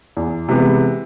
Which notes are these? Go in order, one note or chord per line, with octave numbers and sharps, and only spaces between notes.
E2
C3 E3 G#3 B3